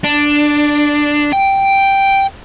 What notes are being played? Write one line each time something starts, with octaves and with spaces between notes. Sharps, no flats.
D4
G5